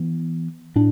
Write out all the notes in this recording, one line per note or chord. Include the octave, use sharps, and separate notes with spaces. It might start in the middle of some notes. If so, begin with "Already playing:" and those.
Already playing: E3 B3
A2 D4